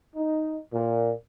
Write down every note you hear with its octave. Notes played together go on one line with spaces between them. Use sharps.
D#4
A#2